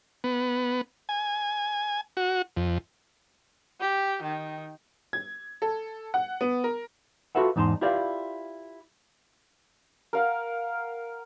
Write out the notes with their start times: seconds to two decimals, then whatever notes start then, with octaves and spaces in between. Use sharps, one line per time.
0.24 B3
1.09 G#5
2.17 F#4
2.57 F2
3.81 G4
4.22 D#3
5.13 G#6
5.62 A4
6.14 F#5
6.41 B3
6.64 A#4
7.35 F4 F#4 A4 B4 E5 F#5
7.56 E2 G#2 D#4 A5 C6
7.81 E4 F4 G4 B4 D5 F5
10.13 A#4 F5 F#5